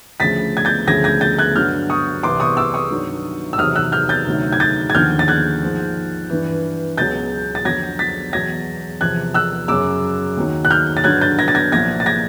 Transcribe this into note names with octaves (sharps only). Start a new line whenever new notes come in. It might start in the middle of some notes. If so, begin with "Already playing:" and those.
D2 C#3 F3 A6 B6
G#6
G6 A6
D2 C#3 F3 G#6 A#6
G#6 A#6
G6 A6
F#6 G#6
G2 D3 F#3 F6 G6
C#6 D#6
C2 C3 E3 C6 D6
C#6 D#6
D6 E6
C#6 D#6
G2 D#3 F#3
E6
E2 C3 D#3 F#3 D#6 F6
E6 F#6
F6 G6
G6 A6
D2 C3 D#3 F#3
G#6
G6 A6
G#6
D#2 D3 F3 F6 G6
A6
F#6 G#6
G#2 F3
G2 E3
C#2 B2 F#3 G6 A6
A6
F2 D3 F#3 G#6 A#6
A6 B6
E2 B2 F#3 G#6 A#6
E2 C3 F3 F#6 G#6
E6 F#6
F#2 C#3 F#3 D6 E6
D#2 D#3 F#3
F#6
F6 G6
A6
G2 D3 F#3 F#6 G#6
G6 A6
G#6 A#6
A6
G#6 A#6
C2 A#2 F3 G#6 A#6
A6
G#6 A#6